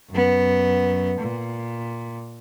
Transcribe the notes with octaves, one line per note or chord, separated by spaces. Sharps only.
F#2 B3
A#2